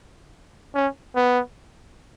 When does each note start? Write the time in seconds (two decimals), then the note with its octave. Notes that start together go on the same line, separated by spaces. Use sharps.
0.75 C#4
1.15 B3